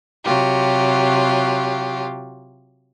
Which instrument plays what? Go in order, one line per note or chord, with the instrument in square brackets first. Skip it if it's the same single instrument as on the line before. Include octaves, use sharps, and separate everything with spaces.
[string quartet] C3 F#3 F4 G4